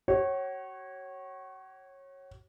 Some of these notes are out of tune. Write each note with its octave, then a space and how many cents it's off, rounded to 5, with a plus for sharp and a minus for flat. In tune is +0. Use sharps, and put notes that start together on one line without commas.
F#4 +35 C#5 -20